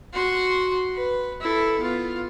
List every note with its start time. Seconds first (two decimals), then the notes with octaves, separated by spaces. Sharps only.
0.13 F#4 C6
0.95 B4
1.41 E4 A4
1.80 B3 F4